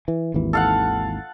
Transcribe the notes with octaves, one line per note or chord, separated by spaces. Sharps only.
E3
G#1 D#2 E3
A4 F5 F#5